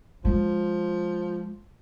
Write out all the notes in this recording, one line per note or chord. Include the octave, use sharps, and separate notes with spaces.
F3 G#3